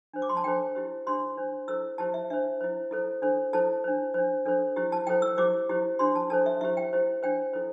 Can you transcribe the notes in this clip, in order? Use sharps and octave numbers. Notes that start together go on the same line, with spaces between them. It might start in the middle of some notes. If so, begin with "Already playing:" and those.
D4 C5
D6
C6
A5
D4 A4 C5 G5
E4 G4 C5
D4 G4 C5 C6
D4 C5
E4 A4 C5 E6
E4 G4 C5 A5
E5
D4 C5 E5
E4 C5
E4 A4 C5
D4 A4 C5
E4 A4 C5 A5
D4 C5
D4 C5
D4 A4 C5
E4 G4 C5
A5
E4 A4 C5 G5
E6
E4 G4 C5 D6
E4 G4 C5
D4 G4 C5 C6
A5
D4 A4 C5 A5
E5
E4 G4 C5 E5
G5
E4 G4 C5
D4 C5 G5
E4 A4 C5